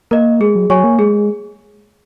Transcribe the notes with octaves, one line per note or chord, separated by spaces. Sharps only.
A#3 A#4 D#5
G#3 G#4
F#3
F#3 C#5 G#5 C#6
A#3
G#3 G#4